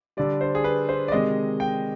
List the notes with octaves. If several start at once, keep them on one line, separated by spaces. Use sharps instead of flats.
D3 G3 D5
C5
G#4
B4
C5
D5
C3 D#3 G#3 D#5
G5